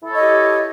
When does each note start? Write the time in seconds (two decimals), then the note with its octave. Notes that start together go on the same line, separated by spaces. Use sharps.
0.01 E4
0.06 A4
0.11 C#5
0.15 D#5
0.20 G4